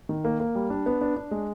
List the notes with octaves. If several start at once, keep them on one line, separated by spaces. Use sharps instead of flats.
D#3
A#3
A#3
G3
D4
B3
D4
D4
G#3